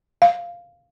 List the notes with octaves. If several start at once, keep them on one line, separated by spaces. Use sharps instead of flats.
F5